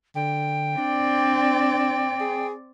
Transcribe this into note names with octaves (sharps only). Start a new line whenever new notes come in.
D3 G5
C4 D4 D5
G#4